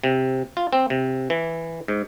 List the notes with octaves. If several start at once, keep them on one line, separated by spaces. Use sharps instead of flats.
C3
F4
C4
C3
E3
G#2